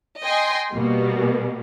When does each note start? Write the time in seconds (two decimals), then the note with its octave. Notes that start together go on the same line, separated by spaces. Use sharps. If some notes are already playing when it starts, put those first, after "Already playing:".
0.23 D#5 G5 G#5 C6
0.72 B2 G3 A#3